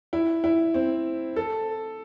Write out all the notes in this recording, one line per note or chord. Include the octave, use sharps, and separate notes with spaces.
E4
E4
C4
A4